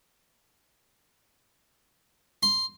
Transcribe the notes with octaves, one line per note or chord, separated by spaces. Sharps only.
C6